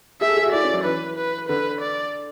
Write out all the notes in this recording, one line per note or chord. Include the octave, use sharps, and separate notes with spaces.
G#4 E5
A4
G#4
F#4
E4 D5
C#4
F#3
E3 B4
B4
D3 B4
D5